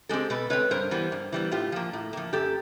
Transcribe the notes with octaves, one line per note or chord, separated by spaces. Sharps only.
G#3 C4 G4 A4
B2 A4 B4
G#3 C4 B4 C#5
G2 A#4 C5
E3 G3 B3
G2
E3 G3 B3
A2 F4 G4
F3 A#3
A2
F3 A#3
F#2 G4 A4